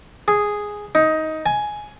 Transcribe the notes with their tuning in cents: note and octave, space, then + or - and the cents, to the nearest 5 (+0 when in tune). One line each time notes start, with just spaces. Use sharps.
G#4 -5
D#4 +15
G#5 +10